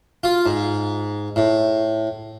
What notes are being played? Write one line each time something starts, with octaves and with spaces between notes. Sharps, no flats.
F4
G#2
A2